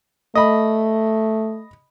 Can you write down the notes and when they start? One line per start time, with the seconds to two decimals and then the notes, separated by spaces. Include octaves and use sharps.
0.35 A3 D#5 B5